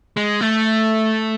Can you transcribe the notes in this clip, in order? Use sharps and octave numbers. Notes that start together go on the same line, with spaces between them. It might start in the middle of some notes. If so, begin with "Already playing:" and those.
G#3
A3